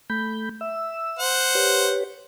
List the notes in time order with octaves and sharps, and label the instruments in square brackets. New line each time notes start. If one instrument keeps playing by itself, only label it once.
[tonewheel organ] A3 B5 G6
E5 E6
[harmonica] C5 F#5
[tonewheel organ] G4 B4 C#5